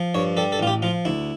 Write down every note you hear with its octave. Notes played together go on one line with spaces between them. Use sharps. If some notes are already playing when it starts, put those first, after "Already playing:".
Already playing: F3
G2 C#5
G3 A4
A4
A1 F4
G4
F3 F4
D2 E4